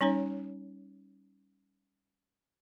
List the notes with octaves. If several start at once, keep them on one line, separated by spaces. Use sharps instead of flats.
G3 C#4 D#4 C#5